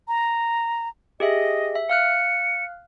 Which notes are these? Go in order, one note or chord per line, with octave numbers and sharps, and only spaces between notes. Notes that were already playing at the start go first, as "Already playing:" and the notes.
A#5
G4 G#4 D#5 E5
E5
F5 F6 F#6 C#7